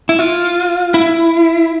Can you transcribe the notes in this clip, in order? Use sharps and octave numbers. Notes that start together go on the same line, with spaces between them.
E4
F4
E4